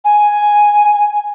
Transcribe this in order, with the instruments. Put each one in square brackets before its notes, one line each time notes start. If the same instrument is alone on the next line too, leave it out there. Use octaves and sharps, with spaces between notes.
[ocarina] G#5